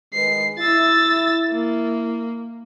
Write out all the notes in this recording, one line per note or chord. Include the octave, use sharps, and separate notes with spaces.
D#3 G#3 B4 C7
E4 E6 A6
A#3